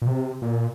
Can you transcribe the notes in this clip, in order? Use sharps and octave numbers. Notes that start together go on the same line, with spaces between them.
A#2
C3
A#2